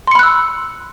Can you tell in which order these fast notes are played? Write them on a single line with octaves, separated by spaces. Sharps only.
C6 C#7 B5 F#6 E6